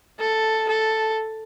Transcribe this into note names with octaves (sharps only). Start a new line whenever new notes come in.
A4
A4